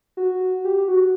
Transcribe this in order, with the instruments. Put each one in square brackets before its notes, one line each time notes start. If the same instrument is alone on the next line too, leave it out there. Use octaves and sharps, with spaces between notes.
[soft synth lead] F#4
G4
F#4